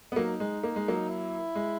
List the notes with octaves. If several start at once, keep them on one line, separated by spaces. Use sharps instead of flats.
B3
F#3 A#3 D#4
G#3
A#3
G#3
F#3 A#3
E4
G#3